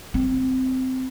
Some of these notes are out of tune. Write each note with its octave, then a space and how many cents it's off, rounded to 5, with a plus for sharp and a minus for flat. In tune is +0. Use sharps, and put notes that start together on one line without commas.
C4 -15